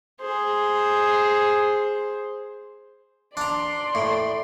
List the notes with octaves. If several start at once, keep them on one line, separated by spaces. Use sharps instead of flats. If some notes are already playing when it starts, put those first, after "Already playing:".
G#4 C5
D4 D5 A#5 C6
A2